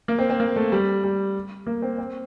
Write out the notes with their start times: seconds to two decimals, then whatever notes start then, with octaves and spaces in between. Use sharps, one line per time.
0.08 A#3
0.19 C4
0.30 C4
0.40 A#3
0.56 A3
0.72 G3
1.04 G3
1.67 A#3
1.82 C4
1.98 C4